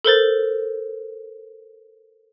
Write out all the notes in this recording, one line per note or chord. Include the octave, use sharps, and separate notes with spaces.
A4 A#4 C5 A6